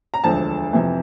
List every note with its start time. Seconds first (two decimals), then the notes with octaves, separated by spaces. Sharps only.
0.14 A#5
0.24 E1 D2 D3 F3 A5
0.73 F2 C3 E3